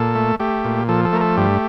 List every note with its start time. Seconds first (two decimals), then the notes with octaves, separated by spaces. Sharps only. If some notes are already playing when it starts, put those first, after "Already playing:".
Already playing: A#2 A4
0.15 A3
0.40 A3 G4
0.65 A#2
0.89 F3 A4
1.05 A4
1.13 A3 A#4
1.21 A4
1.37 G2 G4